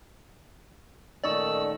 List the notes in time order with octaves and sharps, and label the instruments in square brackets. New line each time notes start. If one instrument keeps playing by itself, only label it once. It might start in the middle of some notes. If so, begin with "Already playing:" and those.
[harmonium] A#2 D#3 A3 [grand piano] C#4 D#4 C#6 [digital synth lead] D5 [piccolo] E6